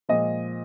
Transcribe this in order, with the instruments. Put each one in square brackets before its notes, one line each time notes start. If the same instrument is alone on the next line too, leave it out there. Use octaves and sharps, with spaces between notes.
[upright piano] A#2 F3 G#3 D#5